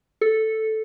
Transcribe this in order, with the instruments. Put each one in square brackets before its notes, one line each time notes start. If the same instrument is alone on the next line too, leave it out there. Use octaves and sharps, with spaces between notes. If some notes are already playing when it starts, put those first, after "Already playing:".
[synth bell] A4